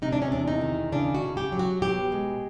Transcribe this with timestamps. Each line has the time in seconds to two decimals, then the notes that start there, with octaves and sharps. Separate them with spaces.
0.02 C3 D#4
0.12 D4
0.22 C#4
0.32 E2 D4
0.48 D#4
0.61 D#3
0.92 C#3 D4
1.15 F#4
1.22 C#3
1.37 G4
1.52 F#3
1.59 F#4
1.82 B2 G4
2.12 G#3